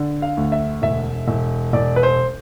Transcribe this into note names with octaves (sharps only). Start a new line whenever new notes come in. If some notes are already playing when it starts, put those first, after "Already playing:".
Already playing: D3
F5
D2
E5
E1 E5
E1
E1 D5
B4
C5